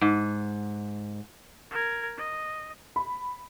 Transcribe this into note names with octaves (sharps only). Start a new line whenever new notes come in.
G#2
A#4 G#6
D#5
B5